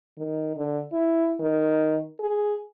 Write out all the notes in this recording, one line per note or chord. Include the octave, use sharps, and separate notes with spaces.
D#3
D3
E4
D#3
G#4